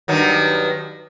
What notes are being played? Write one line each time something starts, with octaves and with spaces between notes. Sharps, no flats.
G2 D#3 F#3